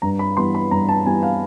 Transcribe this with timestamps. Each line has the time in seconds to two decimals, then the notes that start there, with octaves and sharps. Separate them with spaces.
0.02 G2 A#5
0.19 B5
0.37 E3 G3 B3 C6
0.55 B5
0.71 G2 A#5
0.89 A5
1.06 E3 G3 B3 G#5
1.23 F5